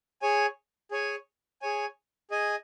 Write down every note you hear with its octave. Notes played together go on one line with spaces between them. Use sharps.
G#4 C#5 G#5
G#4 C#5 G#5
G#4 C#5 G#5
G#4 D#5 G#5